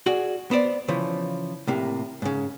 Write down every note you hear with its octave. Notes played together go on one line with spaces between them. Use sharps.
F#4 G#4 D5
B3 C5 D5
C#3 E3 F3
A2 C3 A#3
G#2 C#3